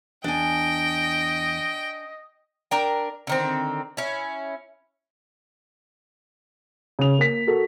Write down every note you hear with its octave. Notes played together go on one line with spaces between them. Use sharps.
E2 D4 D#5 G5 G#5
D4 A#4 G5
D3 D#3 C4
C#4 E4
C#3 F7
A#3 B6
F#4 A4 A#4